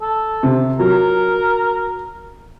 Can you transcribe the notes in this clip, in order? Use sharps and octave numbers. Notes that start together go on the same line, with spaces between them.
A4
C3
F#3 A#4